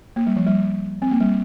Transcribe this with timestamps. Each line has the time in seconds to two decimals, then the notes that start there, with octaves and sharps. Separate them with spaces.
0.16 A#3
0.27 G3
0.36 F3
0.47 G3
1.02 C4
1.11 A#3
1.21 G3